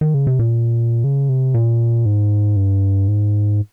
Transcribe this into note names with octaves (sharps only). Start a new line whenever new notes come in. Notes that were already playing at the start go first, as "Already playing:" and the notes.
D#3
C#3
C3
A#2
C#3
C3
A#2
G#2
G2
G#2